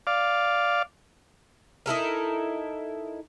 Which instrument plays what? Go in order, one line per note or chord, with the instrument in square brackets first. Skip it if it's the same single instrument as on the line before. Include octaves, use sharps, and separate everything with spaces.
[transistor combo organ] D5 F5
[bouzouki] D#4 E4 A4 A#4